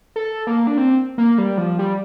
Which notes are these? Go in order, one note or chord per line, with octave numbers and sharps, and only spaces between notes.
A4
A#3
D4
C4
A#3
G3
F3
G3